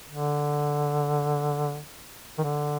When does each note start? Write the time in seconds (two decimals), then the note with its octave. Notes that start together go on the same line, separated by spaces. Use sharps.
0.10 D3
2.38 D#3
2.43 D3